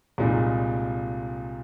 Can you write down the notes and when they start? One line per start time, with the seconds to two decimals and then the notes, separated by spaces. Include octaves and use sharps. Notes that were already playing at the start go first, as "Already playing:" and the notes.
0.18 C2 A#2 G#3 D#4